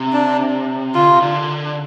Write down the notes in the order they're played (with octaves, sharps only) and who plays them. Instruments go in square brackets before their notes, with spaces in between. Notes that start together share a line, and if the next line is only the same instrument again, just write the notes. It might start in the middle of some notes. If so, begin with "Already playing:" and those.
Already playing: [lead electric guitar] C3
[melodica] D4
[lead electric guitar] D3 [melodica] F4
[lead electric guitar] C3
D3